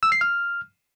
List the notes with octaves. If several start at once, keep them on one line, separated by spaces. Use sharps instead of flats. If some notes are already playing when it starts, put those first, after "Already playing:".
E6
C7
F6